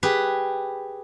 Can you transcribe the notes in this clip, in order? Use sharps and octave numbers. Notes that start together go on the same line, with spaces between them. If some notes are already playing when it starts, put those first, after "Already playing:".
G4 G#4 B4